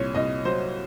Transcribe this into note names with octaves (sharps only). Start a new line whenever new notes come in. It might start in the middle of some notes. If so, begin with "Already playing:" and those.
Already playing: C2 A#2 C#5
C2 D#5
F#3 C5